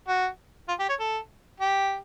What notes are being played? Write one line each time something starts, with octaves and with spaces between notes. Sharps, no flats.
F#4
F4
G4
C#5
A4
G4